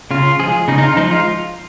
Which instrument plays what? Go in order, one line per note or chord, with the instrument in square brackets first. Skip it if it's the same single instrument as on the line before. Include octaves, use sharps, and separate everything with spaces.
[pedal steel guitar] C#3 F4
F3 G#3 G#4
C#3 D#4
D#4
F4
F3 G#3 D#4
F4